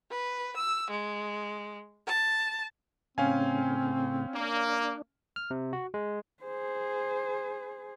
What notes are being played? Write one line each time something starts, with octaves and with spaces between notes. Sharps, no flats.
B4
E6
G#3
A5
A2 C#3 C4 C#4 F5 G#5
A#3 D4
F6
C3
F#4
G#3
G#4 C5